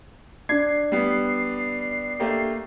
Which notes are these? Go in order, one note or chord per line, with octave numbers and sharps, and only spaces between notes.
D4 G#6 C7
G3 B3
A3 A#3 G4